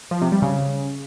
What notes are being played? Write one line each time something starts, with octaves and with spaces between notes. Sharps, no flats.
F3
C3
G3
C#3